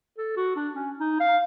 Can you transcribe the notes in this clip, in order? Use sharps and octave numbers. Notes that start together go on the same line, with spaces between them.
A4
F#4
D4
C#4
D#4
F5